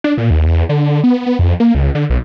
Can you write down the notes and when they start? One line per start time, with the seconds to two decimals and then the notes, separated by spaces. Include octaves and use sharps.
0.04 D4
0.18 A#2
0.30 D#2
0.46 E2
0.69 D3
1.04 B3
1.26 B3
1.39 F2
1.60 A#3
1.75 C#2
1.95 D3
2.10 B1